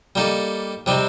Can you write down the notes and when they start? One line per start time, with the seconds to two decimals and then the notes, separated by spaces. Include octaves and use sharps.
0.15 G3 A#3 D#4 A4
0.86 C3 G3 C4 D#4